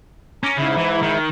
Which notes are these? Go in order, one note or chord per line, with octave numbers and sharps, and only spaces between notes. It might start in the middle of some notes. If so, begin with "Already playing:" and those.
C#4 A#5 D6
G#2 C#3 E4
E3
D#3